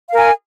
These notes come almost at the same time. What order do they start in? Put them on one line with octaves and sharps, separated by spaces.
F5 A#4 G#5